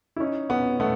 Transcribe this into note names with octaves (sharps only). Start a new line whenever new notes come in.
E4
C#4 D#4
B3 C#4
A3 B3